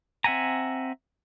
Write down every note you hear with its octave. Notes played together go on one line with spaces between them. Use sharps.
C4 E5 F#5 G#5 A#5